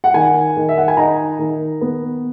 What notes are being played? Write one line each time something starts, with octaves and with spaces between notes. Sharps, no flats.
F#5
D#3 G#5
D#3
E5
F#5
G#5
D#4 A#5
D#3
B3